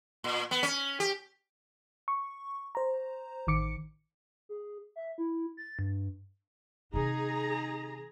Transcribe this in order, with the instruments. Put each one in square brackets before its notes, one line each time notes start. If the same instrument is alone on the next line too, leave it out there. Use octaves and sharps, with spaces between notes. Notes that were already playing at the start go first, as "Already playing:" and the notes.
[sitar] A#2
B3
C#4
G4
[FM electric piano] C#6
C5 A#5
A1 D#3 D6 C#7
[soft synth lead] G#4
E5
E4
A6
G2
[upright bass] C3 D#3 [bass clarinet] D#4 [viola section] G#4 A#5